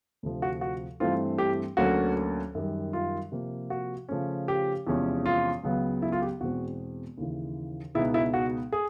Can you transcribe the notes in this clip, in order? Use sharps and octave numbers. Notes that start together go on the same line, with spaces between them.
D2 C3 F3
F#4
F#4
G2 E3 A3 C4 F4
G4
D2 D3 F#3 A#3 C#4 F#4
F#2 D#3 G3
F4
C3 F3 A#3
F#4
C#3 F3 A3 C#4
G4
E2 C3 F3 G#3 C#4
F4
C#2 C#3 F#3 B3
E4
F4
G4
E2 B2 G#3 C4 F#4
D#2 C#3 E3
C#2 B2 G#3 B3 D#4 E4
E4
F#4
G#4